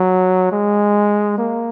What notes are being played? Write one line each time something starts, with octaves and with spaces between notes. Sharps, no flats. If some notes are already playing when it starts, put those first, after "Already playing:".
Already playing: F#3
G#3
A#3